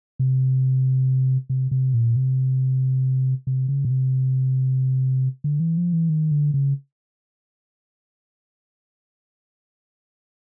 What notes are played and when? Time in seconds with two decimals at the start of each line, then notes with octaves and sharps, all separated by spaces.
0.19 C3
1.50 C3
1.71 C3
1.94 A#2
2.16 C3
3.47 C3
3.68 C#3
3.85 B2
3.91 C3
5.44 D3
5.60 E3
5.77 F3
5.93 E3
6.09 D#3
6.31 D3
6.54 C#3